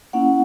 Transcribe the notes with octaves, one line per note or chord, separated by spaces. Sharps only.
A#3 C#4 E4 F#5